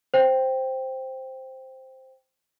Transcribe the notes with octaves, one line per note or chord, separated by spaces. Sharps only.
C5 G5